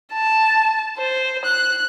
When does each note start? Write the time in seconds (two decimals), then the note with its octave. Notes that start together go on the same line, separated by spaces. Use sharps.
0.13 A5
0.98 C5
1.45 F#6